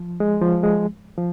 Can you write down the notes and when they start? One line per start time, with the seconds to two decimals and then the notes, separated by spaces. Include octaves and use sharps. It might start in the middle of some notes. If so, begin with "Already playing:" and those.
Already playing: F3
0.20 G#3
0.42 F3
0.63 G#3
1.17 F3